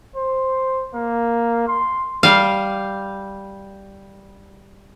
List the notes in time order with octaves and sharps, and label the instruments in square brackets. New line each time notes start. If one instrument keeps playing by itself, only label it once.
[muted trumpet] C5
A#3
C6
[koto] G3 F5